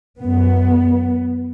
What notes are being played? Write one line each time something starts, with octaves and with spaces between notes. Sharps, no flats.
F#2 B3